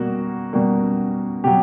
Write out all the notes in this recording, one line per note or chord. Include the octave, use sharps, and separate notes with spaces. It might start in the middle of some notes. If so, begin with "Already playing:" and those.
Already playing: B2 G3 A#3 F#4
B2 G3 A#3
B2 F#3 G4